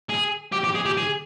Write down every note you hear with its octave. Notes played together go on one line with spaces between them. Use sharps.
G#4
G4
G4
G#4
G4
G#4